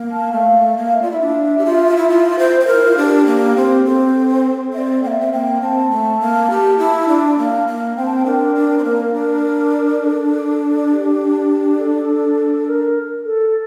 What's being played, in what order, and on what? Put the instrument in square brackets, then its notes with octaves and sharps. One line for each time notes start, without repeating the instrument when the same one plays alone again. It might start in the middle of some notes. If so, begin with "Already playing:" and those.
Already playing: [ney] A#3
[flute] A5
[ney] A3 [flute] F5
[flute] F5
[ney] A#3
[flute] E5
[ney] F4 [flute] D5
[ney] E4 [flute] E5
[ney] D4
G4
F4
E4
F4
C5
C5
A#4
[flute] E4
F4
[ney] D4 [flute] G4
[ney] A#3
C4
[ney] C4 [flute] A4
[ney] C4 [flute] E5
[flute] D5
[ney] A#3 [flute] E5 G5
[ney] C4
[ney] A#3 [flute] G5
[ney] C4 [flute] A5
[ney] A3
A#3
G4
E4
D4
A#3
A#3
[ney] C4 [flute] G5
[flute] A5
G5
[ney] D4 [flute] A#4
[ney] D4
C4
A#3
D4
[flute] A4
G4
A4
A#4
A4